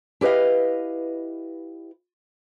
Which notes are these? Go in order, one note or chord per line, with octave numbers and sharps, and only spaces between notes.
E4 G4 B4 D#5 F5